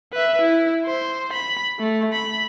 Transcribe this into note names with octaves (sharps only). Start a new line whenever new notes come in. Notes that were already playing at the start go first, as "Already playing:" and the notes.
B4 E5
E4
C5
B5
A3
B5